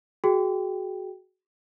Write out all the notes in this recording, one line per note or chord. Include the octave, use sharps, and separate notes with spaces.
F#4 G#4 G5